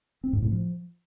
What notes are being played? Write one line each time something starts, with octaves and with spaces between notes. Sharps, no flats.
C4
G#2
A2
F3